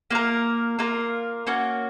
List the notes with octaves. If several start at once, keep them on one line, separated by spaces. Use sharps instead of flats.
A#3 F4 A#4
A#3 F4 A#4
A#3 C#4 F#4